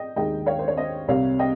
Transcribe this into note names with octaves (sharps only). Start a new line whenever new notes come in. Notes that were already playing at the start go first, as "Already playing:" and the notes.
Already playing: D#5 G5
D#2 D#3 G#3 D#5 G5
C#5 F5
C5
C#5
C5 D#5
C2 C3 G3 C#5 F5
D#5 G5